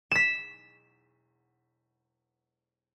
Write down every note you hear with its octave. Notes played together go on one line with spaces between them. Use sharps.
B6 E7